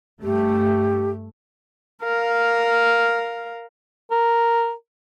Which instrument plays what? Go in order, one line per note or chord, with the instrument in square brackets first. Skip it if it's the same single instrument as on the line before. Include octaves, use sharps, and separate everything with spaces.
[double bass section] G2 A3 [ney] G4
[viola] A#4 F5
[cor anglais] A#4